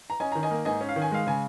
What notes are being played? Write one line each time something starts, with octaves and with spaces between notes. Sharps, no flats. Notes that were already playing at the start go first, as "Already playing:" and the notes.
A#5
C#4 D#5 G#5
D#3 A#5
D#5 G#5
A#3
G#2 D#5 G#5
C#4
F5
D#3
G#5
G#3 F5
C#3 G#5